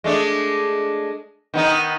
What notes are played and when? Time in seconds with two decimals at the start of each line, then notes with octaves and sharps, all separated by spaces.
0.04 G#3 A3 D4
1.54 D#3 B3 D#4